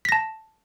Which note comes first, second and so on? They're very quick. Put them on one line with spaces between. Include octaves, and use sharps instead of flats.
B6 A#6 A5